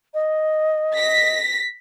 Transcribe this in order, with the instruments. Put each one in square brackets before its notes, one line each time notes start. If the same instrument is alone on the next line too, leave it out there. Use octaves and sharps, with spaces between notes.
[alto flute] D#5
[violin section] A#6 B6